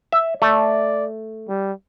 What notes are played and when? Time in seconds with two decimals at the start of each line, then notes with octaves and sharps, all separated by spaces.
0.12 E5
0.42 A3 D5
1.49 G3